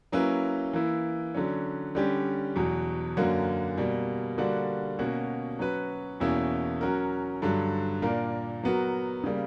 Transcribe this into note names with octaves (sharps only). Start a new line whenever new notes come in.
F#3 A#3 C#4 E4 B4
E3 A#3 E4
D3 F#3 C#4
D3 G3 C#4 G4
E2 B2 F#3
F#2 D3 A#3 C#4 F#4
B2 G3 A#3
D3 G3 A#3 D4 F#4
B2 A#3 C#4 F#4
F#3 C#4 F#4 B4
E2 B2 A#3 C#4 E4
F#3 C#4 F#4 A#4
G2 D3 F#3
A#2 A#3 D4 A#4
F#3 B3 F#4 A#4
C#3 G3 A#3